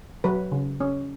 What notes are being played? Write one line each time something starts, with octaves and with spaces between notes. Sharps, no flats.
F#3 B4
C#3
C#4